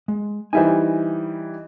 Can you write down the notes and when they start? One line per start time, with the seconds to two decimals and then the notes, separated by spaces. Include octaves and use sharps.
0.08 G#3
0.53 E3 G3 D#4 C5 E5 G#5